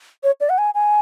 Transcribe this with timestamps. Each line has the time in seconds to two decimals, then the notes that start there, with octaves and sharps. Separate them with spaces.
0.23 C#5
0.40 D5
0.49 F#5
0.58 G#5
0.74 G#5